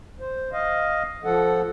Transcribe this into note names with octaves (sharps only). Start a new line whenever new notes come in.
C5
D#5 F5
F3 A4 F#5